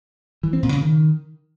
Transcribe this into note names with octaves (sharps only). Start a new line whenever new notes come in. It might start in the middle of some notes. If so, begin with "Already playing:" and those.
E3
C4
A#2
C#3
D#3